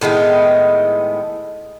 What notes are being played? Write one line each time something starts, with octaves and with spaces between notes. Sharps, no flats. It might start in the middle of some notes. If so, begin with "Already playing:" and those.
A2 D#3 G#3 B3